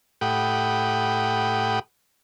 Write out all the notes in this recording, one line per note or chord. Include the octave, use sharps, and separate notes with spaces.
A2 G4 F#5 G5 B5 D#6